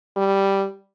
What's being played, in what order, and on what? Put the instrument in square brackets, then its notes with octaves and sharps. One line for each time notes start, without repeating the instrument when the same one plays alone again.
[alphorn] G3